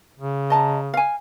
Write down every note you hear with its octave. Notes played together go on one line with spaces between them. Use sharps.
C#3
D#5 A5 A#5
F5 G#5